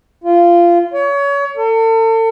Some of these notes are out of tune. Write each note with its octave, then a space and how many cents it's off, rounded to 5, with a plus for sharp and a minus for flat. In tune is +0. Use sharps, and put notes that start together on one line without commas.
F4 -15
C#5 +30
A4 +40